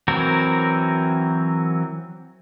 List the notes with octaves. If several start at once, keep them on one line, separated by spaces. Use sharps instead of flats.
E3 F#3 C4 F#4 A#4